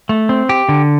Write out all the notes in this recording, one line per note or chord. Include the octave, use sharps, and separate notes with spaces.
A3
C4
G4
D3